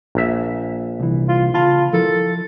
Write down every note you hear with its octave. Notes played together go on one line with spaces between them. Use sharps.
A#1 E5
C2 E3
F4
C#3 F4 A5 B5
F3 E4 A4 A#4